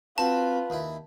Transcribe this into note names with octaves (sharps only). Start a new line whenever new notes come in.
C4 F4 F#4 B4 A5
D#2 E4